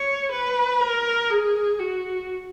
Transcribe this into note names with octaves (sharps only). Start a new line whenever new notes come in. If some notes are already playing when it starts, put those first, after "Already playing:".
Already playing: C#5
B4
A#4
G#4
F#4